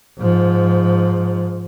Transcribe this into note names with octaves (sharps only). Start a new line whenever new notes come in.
G#2 F3